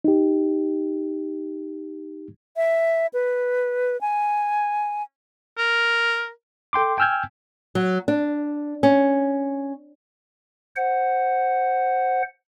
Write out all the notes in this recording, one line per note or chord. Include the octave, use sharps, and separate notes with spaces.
D#4 G4
E5
B4
G#5
A#4
A4 G5 C6 D6
G5 G#5 E6 F6 G6 G#6
F#3
D4
C#4
C5 F#5